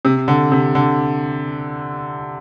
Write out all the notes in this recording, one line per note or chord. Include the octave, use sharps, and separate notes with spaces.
C3
D3
C3
D3